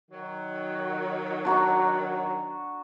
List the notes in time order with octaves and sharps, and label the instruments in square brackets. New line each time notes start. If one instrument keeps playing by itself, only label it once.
[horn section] D#3 F#3
[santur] D4 F#4 A#5